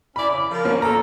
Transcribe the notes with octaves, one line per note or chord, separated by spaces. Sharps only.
C#4 E4 D5 B5
C#3
F3 A#4
A#3 C#4
A4 A#5